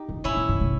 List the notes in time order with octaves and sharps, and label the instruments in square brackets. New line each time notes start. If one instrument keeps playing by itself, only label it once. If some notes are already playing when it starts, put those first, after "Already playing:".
Already playing: [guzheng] D#4 G4
[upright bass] G2
[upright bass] G#2 [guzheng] C#4 E4
[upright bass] A#2
G#2
B2